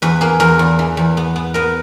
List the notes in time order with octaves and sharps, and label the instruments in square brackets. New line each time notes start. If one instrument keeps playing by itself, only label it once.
[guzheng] E2 B4
A#3 G#4
E2 A#4
E2
E3
E2
B3
B3
B3 A#4